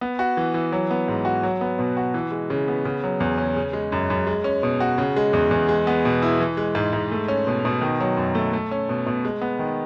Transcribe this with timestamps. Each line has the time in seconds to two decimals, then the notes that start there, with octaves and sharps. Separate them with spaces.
0.01 B3
0.19 F#4
0.37 E3
0.54 E3
0.72 F#3
0.91 B3
1.08 G#2
1.25 F#4
1.43 F#3
1.61 B3
1.79 B2
1.97 F#4
2.14 E3
2.31 G#3
2.50 C#3
2.68 B3
2.85 C#3
3.04 F#3
3.20 E2
3.38 C#4
3.56 C#3
3.73 G#3
3.92 F#2
4.10 F#2
4.27 G#3
4.44 C#4
4.63 B2
4.80 F#4
4.98 C#3
5.16 G#3
5.33 E2
5.51 E2
5.69 G#3
5.87 B3
6.05 B2
6.22 E4
6.40 E3
6.57 G#3
6.75 G#2
6.93 G#2
7.11 A3
7.28 C#4
7.47 B2
7.65 B2
7.82 D#3
8.00 F#3
8.17 F#2
8.35 A3
8.53 A3
8.71 C#4
8.89 B2
9.07 B2
9.25 G#3
9.42 B3
9.59 D#3